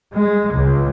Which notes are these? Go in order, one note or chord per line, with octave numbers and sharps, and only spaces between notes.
G#3
C#2